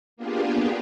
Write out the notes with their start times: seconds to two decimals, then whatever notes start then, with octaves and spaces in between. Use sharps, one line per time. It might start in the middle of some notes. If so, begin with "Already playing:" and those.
0.17 A#3 B3 D4 F4 G4 G#4